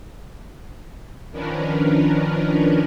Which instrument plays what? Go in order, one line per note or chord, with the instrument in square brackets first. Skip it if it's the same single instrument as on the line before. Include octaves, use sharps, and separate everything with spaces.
[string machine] D#3 F3 C#4 D4 A#4 B4